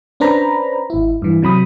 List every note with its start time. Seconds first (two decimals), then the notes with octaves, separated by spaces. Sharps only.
0.20 C#4 D4 B4 C5 A#5 B5
0.90 G#1 E4
1.22 G2 E3
1.42 C3 F#3 B5 D#6